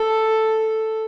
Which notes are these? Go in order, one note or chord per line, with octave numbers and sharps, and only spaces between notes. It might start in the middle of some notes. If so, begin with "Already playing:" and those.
Already playing: A4